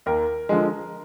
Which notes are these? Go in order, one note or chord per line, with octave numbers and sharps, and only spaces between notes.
D#2 A#4
D3 F3 G#3